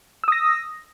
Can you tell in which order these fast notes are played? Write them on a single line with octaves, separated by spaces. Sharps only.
E6 D#6 A#6